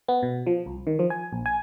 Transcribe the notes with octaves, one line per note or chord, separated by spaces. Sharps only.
B3
B2
F3
C2
D#3
F3
G#5
A#1
G#5